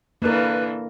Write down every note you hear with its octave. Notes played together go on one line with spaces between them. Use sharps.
D3 E3 A#3 A#4 B4